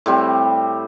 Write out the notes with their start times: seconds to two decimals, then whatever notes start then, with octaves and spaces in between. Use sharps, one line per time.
0.06 A2 G3 C4